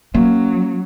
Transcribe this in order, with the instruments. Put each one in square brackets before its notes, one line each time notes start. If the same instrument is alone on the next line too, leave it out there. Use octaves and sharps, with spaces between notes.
[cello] F#3 [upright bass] A#3 C#4